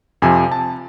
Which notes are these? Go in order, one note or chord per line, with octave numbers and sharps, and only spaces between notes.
F2 C3 F3 G#5
A5